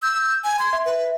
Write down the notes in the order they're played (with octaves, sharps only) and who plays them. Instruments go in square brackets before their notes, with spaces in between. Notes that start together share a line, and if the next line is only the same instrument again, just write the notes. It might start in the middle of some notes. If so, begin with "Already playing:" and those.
[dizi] E6 [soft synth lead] G6
[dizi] G#5
[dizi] C6 [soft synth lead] G#6
[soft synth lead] E5
[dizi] B4